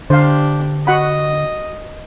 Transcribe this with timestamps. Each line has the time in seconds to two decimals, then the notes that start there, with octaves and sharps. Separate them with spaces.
0.10 D3 D4 G4 C5 F5
0.87 F#4 D#5 F#5 B5